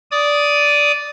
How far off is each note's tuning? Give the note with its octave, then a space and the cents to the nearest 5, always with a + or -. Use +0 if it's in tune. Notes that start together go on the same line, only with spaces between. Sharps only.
D5 -10 D#6 +0